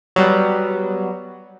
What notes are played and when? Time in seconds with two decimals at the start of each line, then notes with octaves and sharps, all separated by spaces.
0.16 F#3 G3 B3